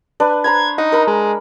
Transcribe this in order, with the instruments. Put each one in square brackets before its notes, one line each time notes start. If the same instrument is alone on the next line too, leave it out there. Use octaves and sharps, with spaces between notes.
[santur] D4 B4
[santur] C5 A#5 B5 [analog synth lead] G#6
[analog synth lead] D#4 [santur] F#5
[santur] A#4 B5
[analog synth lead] G#3